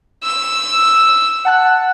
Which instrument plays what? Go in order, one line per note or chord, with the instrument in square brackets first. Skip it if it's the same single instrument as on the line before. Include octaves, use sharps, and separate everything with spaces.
[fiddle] E6
[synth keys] F#5 A5 F#6